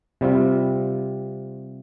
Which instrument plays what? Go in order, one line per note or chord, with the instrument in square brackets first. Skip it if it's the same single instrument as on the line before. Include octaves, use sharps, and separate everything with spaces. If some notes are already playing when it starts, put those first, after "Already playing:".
[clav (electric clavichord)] C3 G3 C4 F4